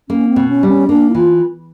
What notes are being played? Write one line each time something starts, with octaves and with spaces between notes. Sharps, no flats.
A#3 C#4
C4
B2
C#4
G3
C#4
A#3 D4
E4
E3 F4